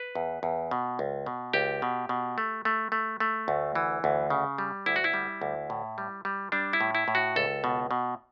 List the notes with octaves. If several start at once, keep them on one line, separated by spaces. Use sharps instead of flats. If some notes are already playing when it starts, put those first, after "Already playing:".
Already playing: B4
E2
E2
B2
C#2
B2
C#2 G4
B2
B2
A3
A3
A3
A3
D2
E3
D2
C#3
G3
D2 E4
F#4
E4
G3
D2
A2
G3
G3
G3 D4
E4
A2
E4
A2
F#4
C#2 A4
B2
B2